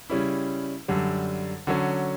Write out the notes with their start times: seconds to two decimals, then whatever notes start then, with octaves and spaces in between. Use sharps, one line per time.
0.10 C#3 G3 C#4 E4
0.88 F#2 D3 G3
1.67 D3 F#3 C#4